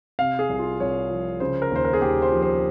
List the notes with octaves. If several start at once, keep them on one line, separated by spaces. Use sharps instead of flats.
C3 F5
G#4
C2
F4
C2 C#5
F3
C#3 C5
A#4
D#2 C5
A#4
G#4
D#2 G4
C5
F3
C5